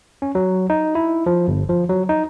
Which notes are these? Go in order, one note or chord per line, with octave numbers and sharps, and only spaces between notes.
C#4
F#3
D#4
E4
F3
G1
F3
F#3
D#4